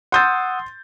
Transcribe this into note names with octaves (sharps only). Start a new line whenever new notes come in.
F#5 C6 D#6 E6 G6 A6